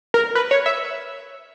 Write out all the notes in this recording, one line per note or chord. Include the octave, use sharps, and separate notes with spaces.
A#4
B4
C#5
E5